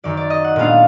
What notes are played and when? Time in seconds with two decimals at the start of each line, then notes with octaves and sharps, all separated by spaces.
0.04 F#2 D#3 F#3 D5
0.17 D5
0.30 D#5
0.44 F#5
0.56 A#2 G#3 B3 D4 F5